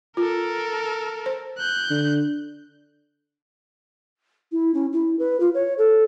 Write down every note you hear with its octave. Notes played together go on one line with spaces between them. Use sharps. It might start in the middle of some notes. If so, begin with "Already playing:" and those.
F4 A4 A#4
C5
F#6 G6
D3
E4
C#4
E4
B4
F4
C#5
A4